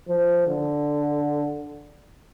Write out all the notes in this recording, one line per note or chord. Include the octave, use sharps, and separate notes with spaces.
F3
D3